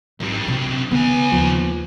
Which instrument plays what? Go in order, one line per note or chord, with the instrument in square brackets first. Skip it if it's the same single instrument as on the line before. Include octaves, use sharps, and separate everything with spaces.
[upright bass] G#1 [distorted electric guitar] F#2 G3
[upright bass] C3 C4
[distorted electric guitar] C#2 G#5 [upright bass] D#3 [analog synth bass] B3
[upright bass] D#2 [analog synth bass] F3